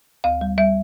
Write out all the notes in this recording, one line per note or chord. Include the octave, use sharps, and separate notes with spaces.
D2 F5
G3
G3 E5